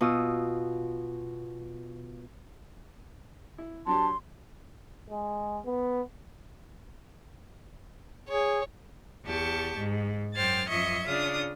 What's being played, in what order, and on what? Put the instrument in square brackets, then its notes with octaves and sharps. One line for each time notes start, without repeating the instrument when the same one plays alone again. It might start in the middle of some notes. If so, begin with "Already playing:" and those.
[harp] B2 F4 D#6 E6
[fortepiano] E4
[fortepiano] F#3 D4 G4 [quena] A5 [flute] C6
[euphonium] G#3
B3
[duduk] G#4 [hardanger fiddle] C#5
[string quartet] E2 G4 A5 C#6
G#2
F#2 C5 G5 F6 G#6 A6
F#2 F3 D#5 E5 C#6 G#6
C#3 D4 F4 D#6